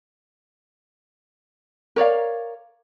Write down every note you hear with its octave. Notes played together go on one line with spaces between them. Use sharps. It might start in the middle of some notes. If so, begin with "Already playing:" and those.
A#4 C#5 D5 F5